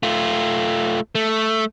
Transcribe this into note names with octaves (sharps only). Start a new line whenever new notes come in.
A3 F4
A3